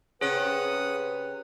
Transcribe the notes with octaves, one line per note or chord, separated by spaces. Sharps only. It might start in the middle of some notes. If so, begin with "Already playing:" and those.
C3 C#4 G#4 B4 C#5 F#5 D#6 F#6